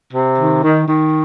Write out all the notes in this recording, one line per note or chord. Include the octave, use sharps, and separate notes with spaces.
C3
D#3
D#3
D#3